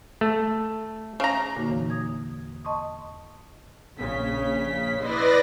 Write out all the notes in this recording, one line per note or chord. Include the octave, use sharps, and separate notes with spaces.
A3
C#3 A#5
A#2 D3 A#3 D#4 F#4
E2 E3 F#4 C#5
D#6 G#6
D#5 A5 C6 C#6 D#6
A#1 C#3 B6
E4 B4 D5 D#5 C6 A#6